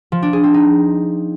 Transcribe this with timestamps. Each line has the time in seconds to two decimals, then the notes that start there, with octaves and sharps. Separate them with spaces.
0.12 F3
0.23 D4
0.33 G#4
0.44 C4
0.54 D#4